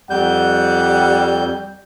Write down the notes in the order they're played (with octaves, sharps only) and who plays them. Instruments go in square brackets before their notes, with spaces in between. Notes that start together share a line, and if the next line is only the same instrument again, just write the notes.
[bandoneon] F2 G6 [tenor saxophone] G3 [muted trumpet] F#5